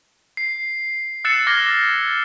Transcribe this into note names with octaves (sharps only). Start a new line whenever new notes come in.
C7
E6 F#6 A6 C7 C#7 E7
D6 E6 F6 G#6 A#6 G7